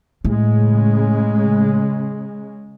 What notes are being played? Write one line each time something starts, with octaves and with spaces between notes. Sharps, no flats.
A2 C#3 G#3